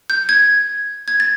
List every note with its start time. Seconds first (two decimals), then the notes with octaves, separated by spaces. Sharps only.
0.10 G6
0.29 G#6
1.08 G#6
1.20 A6